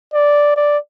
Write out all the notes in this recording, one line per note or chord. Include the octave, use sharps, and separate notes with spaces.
D5
D5